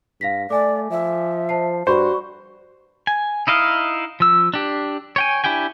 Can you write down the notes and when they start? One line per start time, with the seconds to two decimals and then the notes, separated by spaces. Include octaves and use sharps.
0.21 G2 F5 A#6 B6
0.50 A3 D5 G#5 D6
0.90 F3 E5
1.49 C5 A5 C7
1.87 G2 F#4 C5 D5 B5 C#6
3.07 G#5
3.47 D#4 E4 D#5 F5
4.20 F3 E6
4.54 D4 G4
5.16 C#5 G5 G#5
5.44 D4 E4 G4 G5 G#5